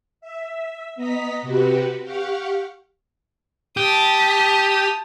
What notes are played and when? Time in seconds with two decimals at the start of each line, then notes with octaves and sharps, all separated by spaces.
0.21 E5
0.96 B3 D#5 A#5 B6
1.42 C3 F#4 G4 B4
2.02 G4 F5 F#5 C#6
3.77 G4 A5 D#6